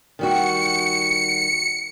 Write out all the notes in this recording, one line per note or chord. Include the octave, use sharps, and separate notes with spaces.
D#3 G3 F#4 C#7